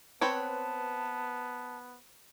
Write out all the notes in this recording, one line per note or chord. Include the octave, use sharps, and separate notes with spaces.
B3 C4 B4 C#5 A5